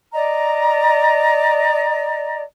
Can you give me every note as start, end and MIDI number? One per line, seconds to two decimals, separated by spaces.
0.12 2.42 74
0.12 2.42 75
0.12 2.42 82